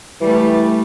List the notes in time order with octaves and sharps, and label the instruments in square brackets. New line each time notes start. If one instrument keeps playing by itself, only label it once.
[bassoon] E3 [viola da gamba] G3 A3